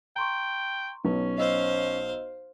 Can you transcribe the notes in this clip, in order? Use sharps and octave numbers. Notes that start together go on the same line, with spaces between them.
G5 A#5 C6 C#6
B1 C#4 B4
C5 D#5 F5 E6